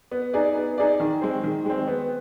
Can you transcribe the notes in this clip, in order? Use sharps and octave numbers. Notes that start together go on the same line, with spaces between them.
B3
D#4 G#4 D5
B3
D#4 G#4 D5
D#3
G#3 C4
D#3
G#3 C4
B3